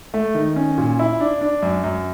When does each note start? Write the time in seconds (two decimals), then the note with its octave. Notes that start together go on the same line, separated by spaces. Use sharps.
0.14 A3
0.35 D#3
0.56 C#4
0.78 A#2
0.99 E4
1.20 D4
1.41 D4
1.63 F#2
1.84 F#2